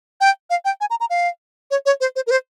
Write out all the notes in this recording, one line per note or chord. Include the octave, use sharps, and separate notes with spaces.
G5
F5
G5
G#5
A#5
A#5
F5
C#5
C#5
C5
C5
A#4
C5